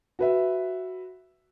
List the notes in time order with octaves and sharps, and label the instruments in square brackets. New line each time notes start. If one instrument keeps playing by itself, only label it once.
[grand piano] F#4 B4 E5